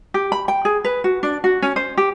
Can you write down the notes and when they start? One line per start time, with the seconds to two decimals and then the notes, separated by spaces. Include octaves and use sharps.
0.14 G4
0.32 B5
0.48 G5
0.65 G#4
0.84 B4
1.04 F#4
1.23 D4
1.44 F#4
1.62 C#4
1.76 C5
1.97 G4